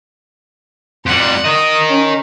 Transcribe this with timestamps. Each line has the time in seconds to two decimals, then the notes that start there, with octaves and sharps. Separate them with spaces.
1.06 F2 G3 F#5 C6
1.45 A#4 D#5 D#6
1.88 C#4